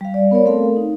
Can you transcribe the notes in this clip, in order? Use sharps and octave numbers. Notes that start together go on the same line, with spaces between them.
G3 F5
D5
B3 A#4 C#5 D5
A3 C4 A4 A#4 F5
D#4